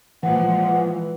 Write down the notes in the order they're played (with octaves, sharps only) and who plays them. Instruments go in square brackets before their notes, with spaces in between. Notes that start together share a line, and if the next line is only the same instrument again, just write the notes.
[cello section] A#2 F3 G#3 [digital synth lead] E3 [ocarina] F#5